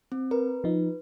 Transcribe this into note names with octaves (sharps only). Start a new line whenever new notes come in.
C4
A#4 B4
F3 D#4